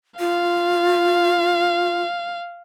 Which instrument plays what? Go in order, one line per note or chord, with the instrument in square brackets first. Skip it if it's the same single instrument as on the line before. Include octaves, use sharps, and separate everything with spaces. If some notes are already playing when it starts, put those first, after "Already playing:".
[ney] F4 [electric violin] F5